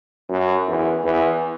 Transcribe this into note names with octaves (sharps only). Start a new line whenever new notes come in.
F#2
E2
E2